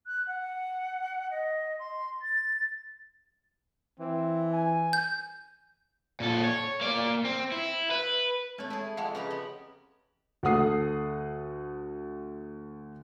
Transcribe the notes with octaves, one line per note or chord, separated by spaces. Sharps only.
F#6
F#5
D#5
C6
A6
E3 C4
G#5
G6
A#2 A4
C#5
A#3 D5
C4
E4
B4
G#3 A3 C4 A4 C#5
E4 G#4 A5
F2 G#3 F5 F#5 A5
C#3 G4 B4 A#5 B5
B3
D2 A4 F#5 D#6 C7